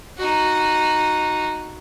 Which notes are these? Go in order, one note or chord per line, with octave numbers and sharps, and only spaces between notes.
D#4 F#4